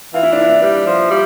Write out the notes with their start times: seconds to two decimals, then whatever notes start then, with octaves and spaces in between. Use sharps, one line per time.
0.14 E3 F4
0.23 E4
0.32 D4
0.42 E4
0.63 G3
0.86 F3
1.11 G3